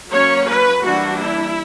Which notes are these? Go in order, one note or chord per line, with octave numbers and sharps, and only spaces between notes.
F#3 A#3 C#4 C#5
B4
E3 G3 A#3 D4 F#4
E4